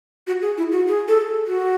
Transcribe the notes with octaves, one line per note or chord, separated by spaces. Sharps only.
F#4
G#4
E4
F#4
G#4
A4
F#4